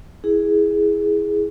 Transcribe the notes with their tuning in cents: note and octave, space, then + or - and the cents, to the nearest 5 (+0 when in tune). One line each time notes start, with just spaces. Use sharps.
E4 -5 G#4 +0